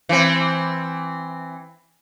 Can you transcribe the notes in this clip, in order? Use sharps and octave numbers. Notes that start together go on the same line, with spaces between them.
E3 C4